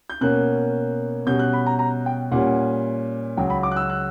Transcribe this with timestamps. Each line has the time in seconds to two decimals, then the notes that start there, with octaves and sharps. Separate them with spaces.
0.10 G6
0.21 B2 A#3 C#4 F#6
1.27 B2 G3 C#4 G6
1.39 F#6
1.53 B5
1.66 A#5
1.79 A#5
2.06 G5
2.32 A#2 G3 C#4 F#5
3.37 C#2 C#3 F#3 G5
3.50 B5
3.63 D6
3.71 F#6
3.76 E6
3.89 F#6